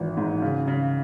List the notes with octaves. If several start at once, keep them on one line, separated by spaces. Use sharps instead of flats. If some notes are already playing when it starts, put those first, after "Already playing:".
Already playing: G#1 E3
G#2
C#3
C#3